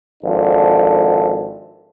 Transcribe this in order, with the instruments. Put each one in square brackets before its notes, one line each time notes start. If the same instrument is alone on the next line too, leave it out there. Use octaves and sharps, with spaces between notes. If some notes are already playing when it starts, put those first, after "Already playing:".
[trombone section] G#1 F3 D4 A4